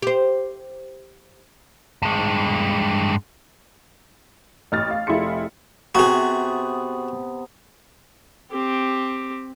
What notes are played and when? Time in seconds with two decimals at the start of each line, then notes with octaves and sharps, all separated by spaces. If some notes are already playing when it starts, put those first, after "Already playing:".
0.02 G4 C5
2.02 G2 G#3
4.72 A1 F6 A6
4.91 F5
5.07 F1 E4 F4 G#4 C6 C#7
5.95 C3 B3 F#4 G#4
8.52 C4 G4